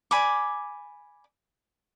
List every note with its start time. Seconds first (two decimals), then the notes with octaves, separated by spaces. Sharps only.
0.11 D5 G#5 B5 D6